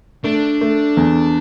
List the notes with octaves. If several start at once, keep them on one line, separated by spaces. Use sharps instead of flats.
A3 D4
A3
E2